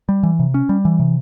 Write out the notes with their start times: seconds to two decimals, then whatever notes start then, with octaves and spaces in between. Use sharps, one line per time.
0.09 G3
0.23 E3
0.39 C3
0.54 C#4
0.69 G3
0.85 E3
1.00 C3